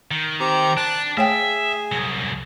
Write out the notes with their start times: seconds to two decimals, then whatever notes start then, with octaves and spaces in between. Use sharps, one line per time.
0.11 D#3
0.40 C4 G4 A#5
0.77 D4 A5 F#6
1.17 A3 G#4 C#5 E5 G5
1.92 C2 F#3